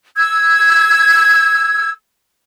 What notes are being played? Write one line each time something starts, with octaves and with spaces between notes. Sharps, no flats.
E6 G#6